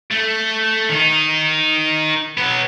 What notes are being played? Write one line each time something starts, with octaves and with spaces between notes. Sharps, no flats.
A3
D#3 D#4
F#3 B3